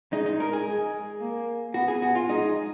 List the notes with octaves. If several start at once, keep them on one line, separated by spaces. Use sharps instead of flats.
G#3 D#4
D#4
A#4
G#4
G#3
A#3
B3 F#4
G#4
F#4
F4
G#3 D#4